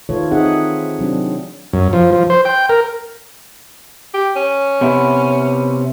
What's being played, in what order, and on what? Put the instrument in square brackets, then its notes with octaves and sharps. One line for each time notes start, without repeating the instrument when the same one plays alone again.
[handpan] D#3 E3 A3 F4 A4 C#5
C4 D#4 G#4 E5 F#5
C3 F#3 C4 D4
[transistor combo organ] F#2
F3
F3
C5
G5
A#4
[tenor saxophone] G4
C#4
[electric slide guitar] C3 B3 E4